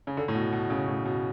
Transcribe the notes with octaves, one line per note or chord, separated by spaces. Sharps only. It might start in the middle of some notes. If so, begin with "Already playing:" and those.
C#3
D3
A2
B2
B2
C#3
A2
B2